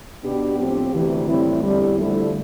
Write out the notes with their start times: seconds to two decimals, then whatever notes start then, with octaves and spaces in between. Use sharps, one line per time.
0.24 B2 B3 D4 G4
0.59 A2 F3 C4 G4
0.93 D2 C3 E3
1.29 A2 G3 C4 E4
1.63 E2 D3 G3
1.99 D3 F3 A3 E4 A4